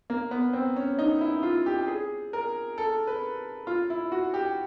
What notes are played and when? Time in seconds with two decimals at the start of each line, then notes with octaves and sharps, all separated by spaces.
0.10 A#3
0.31 B3
0.53 C4
0.76 C#4
0.99 D#4
1.21 E4
1.43 F4
1.66 G4
1.88 G#4
2.33 A#4
2.78 A4
3.07 B4
3.67 F4
3.90 E4
4.12 F#4
4.34 G4